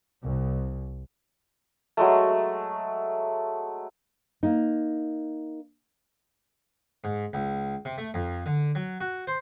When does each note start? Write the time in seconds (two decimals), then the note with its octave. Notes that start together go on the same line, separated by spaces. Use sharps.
0.23 C2
1.97 F#3 G#3 A3
4.43 A#3 D#4
7.04 G#2
7.33 C#2
7.85 C3
7.98 A3
8.14 F2
8.46 D3
8.75 F#3
9.01 F#4
9.27 C5